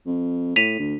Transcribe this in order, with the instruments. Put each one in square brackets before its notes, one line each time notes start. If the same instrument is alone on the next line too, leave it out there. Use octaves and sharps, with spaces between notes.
[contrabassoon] F2
[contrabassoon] A2 [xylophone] B6 D#7 F7
[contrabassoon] D2